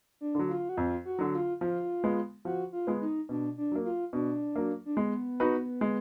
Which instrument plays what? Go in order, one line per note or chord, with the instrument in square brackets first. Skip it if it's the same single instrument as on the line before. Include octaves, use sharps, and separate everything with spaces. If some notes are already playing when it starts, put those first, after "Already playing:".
[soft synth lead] D4
[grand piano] D3 F#3
[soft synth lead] F4
F#4
[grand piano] F2 [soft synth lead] F4
[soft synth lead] F#4
[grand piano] D3 F#3
[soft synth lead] F4
[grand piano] F3 [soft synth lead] F4
[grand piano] G#3 B3
[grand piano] F3 [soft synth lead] F#4
[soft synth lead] F4
[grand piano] G#3 B3
[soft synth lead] D#4
[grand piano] B2 [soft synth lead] D4
[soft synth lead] D4
[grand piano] F#3 A#3
[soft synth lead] F4
[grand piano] B2 [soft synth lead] D4
[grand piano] F#3 A#3
[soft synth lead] D4
[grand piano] G#3 [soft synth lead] B3
[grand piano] D#4 F#4 B4
G#3